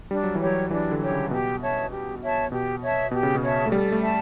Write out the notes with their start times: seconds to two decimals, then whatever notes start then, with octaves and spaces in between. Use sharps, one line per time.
0.11 G3 D4
0.23 F#3
0.35 E3
0.41 G4 C#5
0.47 F#3
0.71 E3 D4
0.92 D3
1.01 G4 C#5
1.12 C#3
1.31 B2 G4
1.62 C#5 E5 A5
1.91 G4
2.22 C#5 E5 A5
2.52 B2 G4
2.82 C#5 E5 A5
3.11 B2 G4
3.23 C#3
3.35 B2
3.42 C#5 E5 A5
3.66 A3
3.72 G3 A4
3.92 A3
4.02 E5 A5